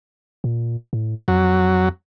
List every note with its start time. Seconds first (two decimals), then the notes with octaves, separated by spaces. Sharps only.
0.44 A#2
0.93 A2
1.28 F2 F#3